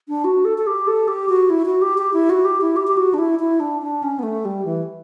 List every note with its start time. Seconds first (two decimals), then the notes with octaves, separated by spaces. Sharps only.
0.08 D4
0.24 F#4
0.45 A4
0.58 A4
0.67 G4
0.87 A4
1.08 G4
1.29 F#4
1.50 E4
1.66 F#4
1.82 G4
1.98 G4
2.13 E4
2.30 F#4
2.45 G4
2.61 E4
2.76 G4
2.87 G4
2.97 F#4
3.14 D4
3.19 E4
3.39 E4
3.60 D4
3.82 D4
4.03 C#4
4.19 B3
4.23 A3
4.45 G3
4.65 E3